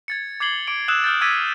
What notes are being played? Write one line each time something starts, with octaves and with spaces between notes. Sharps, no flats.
G#6 A6 C#7
D6 G#6 C7 F#7 G7
D6 D7
D#6 E6 F#6 E7
D#6 F6 G6 A6
D6 E6 G#6 A6 B6 D#7